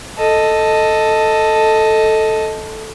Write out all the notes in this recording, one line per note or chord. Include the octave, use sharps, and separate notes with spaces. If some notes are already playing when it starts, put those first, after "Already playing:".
A4 D#5